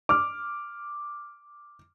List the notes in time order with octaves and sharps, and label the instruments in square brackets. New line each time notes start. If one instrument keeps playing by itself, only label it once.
[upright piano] D6 F6